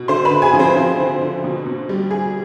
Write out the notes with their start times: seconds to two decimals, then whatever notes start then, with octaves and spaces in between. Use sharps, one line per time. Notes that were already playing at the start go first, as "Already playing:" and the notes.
Already playing: B2
0.08 D3 C5 C6
0.25 B4 B5
0.31 D3
0.42 G#4 G#5
0.53 F3
0.59 C4 C5
0.77 F3
0.99 D3
1.21 D3
1.44 B2
1.66 B2
1.89 G3
2.11 G3 G#4